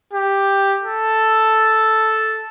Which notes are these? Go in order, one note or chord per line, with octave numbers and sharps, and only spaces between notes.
G4
A4